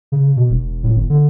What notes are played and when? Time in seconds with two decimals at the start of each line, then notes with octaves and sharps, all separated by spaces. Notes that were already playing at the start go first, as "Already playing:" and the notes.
0.12 C#3
0.36 B2
0.50 E1
0.83 A2
0.96 G1
1.10 D3